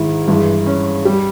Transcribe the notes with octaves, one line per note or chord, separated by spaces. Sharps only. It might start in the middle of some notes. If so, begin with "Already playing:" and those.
Already playing: G#2 D#3 G#3 E4
G2 E3 G#3
C#4
G3